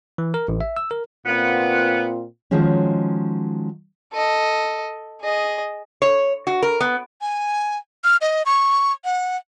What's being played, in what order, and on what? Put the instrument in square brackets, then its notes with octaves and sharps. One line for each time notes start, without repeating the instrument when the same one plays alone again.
[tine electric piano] E3
A#4
A1
E5
E6
A#4
[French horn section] A#2 C4 F4 [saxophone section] B3
[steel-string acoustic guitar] D#3 F3 F#3 G#3 C#4
[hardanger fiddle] A4 D#5
G#4 D#5
[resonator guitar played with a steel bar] C#5
F#4
A#4
B3
[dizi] G#5
F6
D#5
C#6
F#5